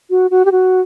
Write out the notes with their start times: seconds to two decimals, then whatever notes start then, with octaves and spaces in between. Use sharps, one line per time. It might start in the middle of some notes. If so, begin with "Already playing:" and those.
0.10 F#4
0.31 F#4
0.45 G4
0.52 F#4